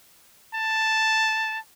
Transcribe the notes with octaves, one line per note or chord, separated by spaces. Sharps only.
A5